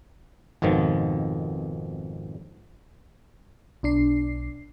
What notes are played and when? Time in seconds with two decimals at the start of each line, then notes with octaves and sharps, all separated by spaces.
0.62 G#1 F2 B2 D#3 F3
3.83 B1 D4 C7